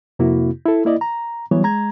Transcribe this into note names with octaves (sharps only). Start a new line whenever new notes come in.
F2 C3 A#3 E4 F#4
E4 A4
A#3 E4 D5 D#5
A#5
E3 F#3 G3 B3 C#5
G#3 A#5 G#6